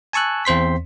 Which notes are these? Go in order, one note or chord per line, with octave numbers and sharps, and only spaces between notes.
G#5 A5 C#6 E6 F#6
E2 C4 C5 C6 B6